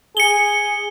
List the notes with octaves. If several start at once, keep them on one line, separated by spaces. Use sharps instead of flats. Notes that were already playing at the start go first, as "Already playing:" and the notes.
G#4 C#7 G7